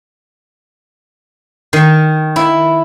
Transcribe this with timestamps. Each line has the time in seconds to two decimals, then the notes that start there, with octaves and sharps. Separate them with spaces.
1.73 D#3
2.36 E4